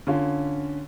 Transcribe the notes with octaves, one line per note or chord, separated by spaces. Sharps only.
D3 C#4 F4